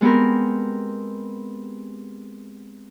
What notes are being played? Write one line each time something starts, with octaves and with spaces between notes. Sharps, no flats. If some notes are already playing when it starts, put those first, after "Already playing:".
G#3 B3 C4 G4 A#4